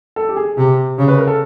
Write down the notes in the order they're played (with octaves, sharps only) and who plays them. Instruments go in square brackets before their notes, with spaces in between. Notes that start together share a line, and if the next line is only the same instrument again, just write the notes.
[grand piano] A4
G4
G#4
[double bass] C3 [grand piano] G4
[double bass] C#3
[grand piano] B4
A#4
A4